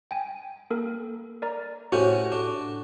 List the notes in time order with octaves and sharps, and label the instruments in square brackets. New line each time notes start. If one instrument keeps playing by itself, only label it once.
[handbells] G5 G#5
A#3 A4 A#4
A#4 D5 A#5
[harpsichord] A2 C#4 [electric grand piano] F#4 [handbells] G4 C5
[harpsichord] D4